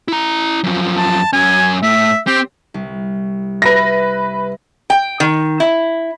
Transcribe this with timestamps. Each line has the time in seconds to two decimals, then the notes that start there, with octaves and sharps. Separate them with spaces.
0.08 E4 A#5
0.64 F#2 F3
0.97 A5
1.33 F#2 C#4 G#5
1.83 A2 E5
2.27 C4 G4
2.74 C2
3.62 B4 E5 A#6
4.90 G5
5.20 D#3
5.60 E4